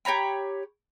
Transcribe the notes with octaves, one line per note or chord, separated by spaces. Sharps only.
G4 C#5 A#5 B5